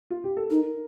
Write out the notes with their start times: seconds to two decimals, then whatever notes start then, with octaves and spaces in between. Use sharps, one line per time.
0.10 F4
0.24 G4
0.37 A4
0.50 D#4 A#4